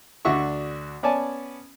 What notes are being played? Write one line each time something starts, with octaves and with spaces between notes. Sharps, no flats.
D2 D4 F#4 E5 C#6
B3 C#4 D5 G#5 A5